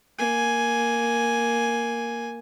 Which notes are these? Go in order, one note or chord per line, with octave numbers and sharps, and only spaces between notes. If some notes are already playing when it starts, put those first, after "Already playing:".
A#3 G#5